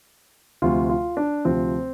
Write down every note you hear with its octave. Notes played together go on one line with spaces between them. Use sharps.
D2 C3 F3 F4
F4
D4
D2 C3 F3 C4